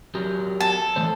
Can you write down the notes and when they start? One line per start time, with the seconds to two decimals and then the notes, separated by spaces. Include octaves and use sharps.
0.15 F#3 G4 A#4
0.61 A4
0.96 E3 A3 C5